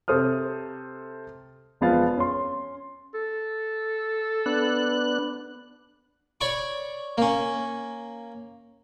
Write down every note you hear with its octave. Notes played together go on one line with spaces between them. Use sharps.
C3 A4 C5 D#6 F6
E1 F3 B3 F5 A6
C#4 C6
A4
B3 D4 F#6
C#5 D5 B5 C#6 D6
A#3 C#4